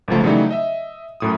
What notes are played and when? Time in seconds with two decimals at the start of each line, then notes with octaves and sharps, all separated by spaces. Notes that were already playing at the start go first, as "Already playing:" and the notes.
0.08 G1 C#2 F3 A3
0.23 C#3 E3 F#3 G3 A3 D#4
0.51 D#5 E5
1.20 F#2 A2 D#6